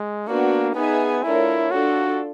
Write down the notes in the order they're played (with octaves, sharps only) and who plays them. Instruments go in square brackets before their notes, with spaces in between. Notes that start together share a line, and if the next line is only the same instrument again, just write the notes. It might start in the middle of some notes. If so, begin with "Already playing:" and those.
Already playing: [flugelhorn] G#3
[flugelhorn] A#3 [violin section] B3 D4 F#4
[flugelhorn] B3 [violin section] D#4 G#4 B4 E5 G#5
[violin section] A3 D4 F4 A#4 C#5 [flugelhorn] E4
[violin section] D4 F4 A4 [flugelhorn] F#4